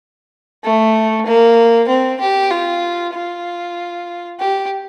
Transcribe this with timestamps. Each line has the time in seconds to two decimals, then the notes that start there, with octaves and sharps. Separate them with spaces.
0.63 A3
1.26 A#3
1.88 C4
2.20 G4
2.51 F4
3.14 F4
4.39 G4